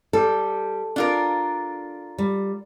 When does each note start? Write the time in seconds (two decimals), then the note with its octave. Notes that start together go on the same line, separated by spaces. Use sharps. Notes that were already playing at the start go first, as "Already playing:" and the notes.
0.13 G3 A4
0.96 D4 F4 A#4
2.18 G3